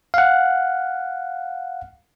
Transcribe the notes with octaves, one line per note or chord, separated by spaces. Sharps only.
F5 F#5